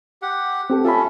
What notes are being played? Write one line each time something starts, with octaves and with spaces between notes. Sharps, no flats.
G4 F#5
C4 G4 A4
A3 C#4 F4 A4 B5